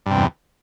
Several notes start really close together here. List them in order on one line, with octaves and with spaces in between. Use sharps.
G2 C3 E2